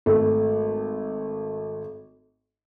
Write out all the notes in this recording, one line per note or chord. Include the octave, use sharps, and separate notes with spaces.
G#1 A3